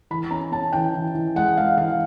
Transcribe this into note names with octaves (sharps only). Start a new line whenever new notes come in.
E3 B5
C#4 A#5
C#4 A5
E3 G5
E3
E3
G#3 F#5
G#3 F5
E3 F5